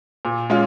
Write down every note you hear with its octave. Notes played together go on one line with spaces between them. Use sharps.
A#2
G#3 C#4 F4